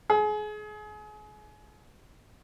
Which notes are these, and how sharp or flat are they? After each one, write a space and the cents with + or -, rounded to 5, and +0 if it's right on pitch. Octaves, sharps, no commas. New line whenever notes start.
G#4 +30